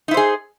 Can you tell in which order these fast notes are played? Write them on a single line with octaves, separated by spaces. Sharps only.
D#4 E4 C5 G#4